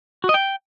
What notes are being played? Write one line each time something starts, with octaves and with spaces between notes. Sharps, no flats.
F#4
D#5
G5